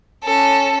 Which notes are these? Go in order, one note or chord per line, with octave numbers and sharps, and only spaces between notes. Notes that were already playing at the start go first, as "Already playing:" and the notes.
C#4 A4